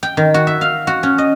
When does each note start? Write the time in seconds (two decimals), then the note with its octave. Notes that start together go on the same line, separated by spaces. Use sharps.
0.03 G5
0.17 D#3
0.34 F#4
0.47 E5
0.61 F5
0.87 F#4
1.03 C#4
1.18 D#5